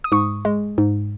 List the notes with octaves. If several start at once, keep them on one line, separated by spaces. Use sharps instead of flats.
D#6
G#2 C#6
G#3
G#2